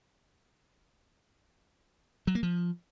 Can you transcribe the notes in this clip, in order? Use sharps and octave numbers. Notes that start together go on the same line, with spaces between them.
F#3
A#3
F3